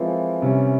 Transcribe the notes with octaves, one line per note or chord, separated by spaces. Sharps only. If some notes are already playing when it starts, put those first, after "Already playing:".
Already playing: E3 F3 G#3 C4 F4 A#4
C3 G3 C#4